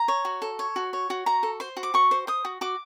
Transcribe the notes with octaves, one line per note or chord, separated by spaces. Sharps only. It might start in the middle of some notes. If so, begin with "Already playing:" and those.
Already playing: A#5
C#5
F#4
A4
C#5
F#4
C#5
F#4
F#4 A#5
A4
C5 C6
F#4
D6
F#4 C#6
C5
C5 D#6
F#4
F#4 D6